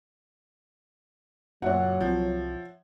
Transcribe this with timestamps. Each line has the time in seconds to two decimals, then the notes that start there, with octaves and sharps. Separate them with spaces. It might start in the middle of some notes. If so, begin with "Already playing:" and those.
1.62 F#1 A#2 F#3 F#4 C#5 E5 F#5
2.00 C2 F3